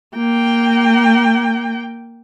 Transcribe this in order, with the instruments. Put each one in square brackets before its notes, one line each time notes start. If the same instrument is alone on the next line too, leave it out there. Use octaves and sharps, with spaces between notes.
[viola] A#3 G5